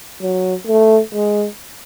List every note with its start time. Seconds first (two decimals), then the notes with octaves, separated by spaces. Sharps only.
0.22 F#3
0.67 A3
1.13 G#3